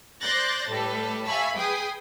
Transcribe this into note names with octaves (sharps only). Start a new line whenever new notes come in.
C5 D5 F#6 G6 A6 A#6
A2 G3 A4 B4
E5 F5 G#5 A5 B5 C#6
G#4 B4 G5 G#5 D#6